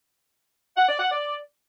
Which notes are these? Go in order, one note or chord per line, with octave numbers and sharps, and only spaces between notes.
F#5
D5
F#5
D5